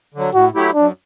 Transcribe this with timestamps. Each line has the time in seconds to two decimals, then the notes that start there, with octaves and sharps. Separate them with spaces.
0.14 D3 F#3
0.33 A2 F#4
0.54 F#3 A3 E4 G4
0.75 F#2 D4